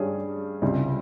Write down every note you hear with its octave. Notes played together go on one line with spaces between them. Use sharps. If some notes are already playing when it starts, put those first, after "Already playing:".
Already playing: G2 G3 C#4 G#4
C#2 C3 G3